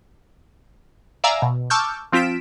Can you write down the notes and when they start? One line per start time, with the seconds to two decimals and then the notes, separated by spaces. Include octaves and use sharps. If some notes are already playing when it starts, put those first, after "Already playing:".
1.24 D5 E5 F5 G#5 A#5 E6
1.42 B2
1.70 A5 C#6 D6 E6 F6 G6
2.12 F3 C4 F4 B6 D7 E7